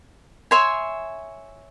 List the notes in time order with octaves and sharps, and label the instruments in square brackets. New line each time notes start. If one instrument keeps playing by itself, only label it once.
[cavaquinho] C#5 E5 G#5 C6